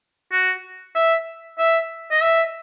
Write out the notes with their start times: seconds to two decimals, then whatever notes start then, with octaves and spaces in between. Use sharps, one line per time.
0.32 F#4
0.95 E5
1.59 E5
2.11 D#5
2.22 E5